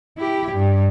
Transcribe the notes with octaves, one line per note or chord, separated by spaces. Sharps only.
E4 G4
G2